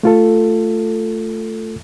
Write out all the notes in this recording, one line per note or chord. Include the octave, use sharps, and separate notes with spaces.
A3 F4 A4